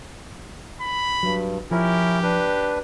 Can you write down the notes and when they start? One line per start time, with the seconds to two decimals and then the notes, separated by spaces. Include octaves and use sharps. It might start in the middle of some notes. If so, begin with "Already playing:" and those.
0.81 B5
1.23 G2 F#3
1.71 F3 C#4 E4 G4 A#4
2.23 D4 B4